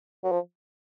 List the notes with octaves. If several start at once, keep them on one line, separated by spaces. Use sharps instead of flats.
F#3
F3